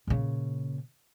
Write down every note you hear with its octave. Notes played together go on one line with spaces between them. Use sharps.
A#2 C#3